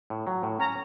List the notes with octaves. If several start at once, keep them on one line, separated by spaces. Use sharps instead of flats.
A2
F#3
A2
C#4 A#5